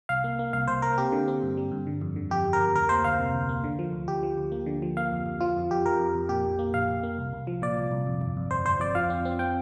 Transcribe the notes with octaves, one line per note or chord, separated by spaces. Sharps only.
C2 F5
A#3
A#3
C2 F5
C2 C5
A#3 A#4
C4 G4
D3
C4
G2
G3
G2
D3
F2
D3
F2 G4
F2
A#4
F2
D2 A#4
A#3 C5
D2 F5
C3
D2
A#3
D3
F3
D2
D2 G4
F3
D2
A#3
D3
F3
A#3 F5
F2
F2
F3 F4
F2
F2 G4
F2 A#4
F2
F2
A#2 G4
A#1
A#3
A#1 F5
A#1
A#3
C2
C2
F3
A#2 D5
C2
C2
F2
G1
F2
G1 C5
G1 C5
F2 D5
F3 F5
C4
C4
C4 G5